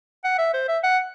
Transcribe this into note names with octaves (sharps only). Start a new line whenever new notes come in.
F#5
E5
C5
E5
F#5